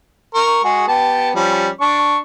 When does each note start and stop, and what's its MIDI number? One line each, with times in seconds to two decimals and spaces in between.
0.34 0.60 70
0.34 0.60 85
0.64 0.84 56
0.64 0.84 66
0.64 0.84 68
0.88 1.30 59
0.88 1.30 67
0.88 1.30 81
1.35 1.69 53
1.35 1.69 55
1.35 1.69 61
1.81 2.18 62
1.81 2.18 85